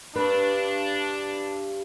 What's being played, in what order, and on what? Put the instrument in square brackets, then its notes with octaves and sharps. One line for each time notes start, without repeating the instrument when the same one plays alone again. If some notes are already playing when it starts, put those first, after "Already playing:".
[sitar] G2 [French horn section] D4 [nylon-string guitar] B4